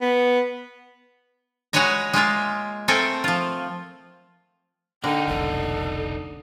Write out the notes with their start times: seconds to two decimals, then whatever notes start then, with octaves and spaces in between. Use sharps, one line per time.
0.01 B3
1.73 G#3 F#4 B4 C#5 G#5 A#5
2.13 G#3 A#3 F4 E5
2.88 A3 C4 A4 A#4 G#5 A#5
3.24 F3 F4
5.04 D3 A#3 D4 D#4 G5
5.28 F1 B1 E3 A4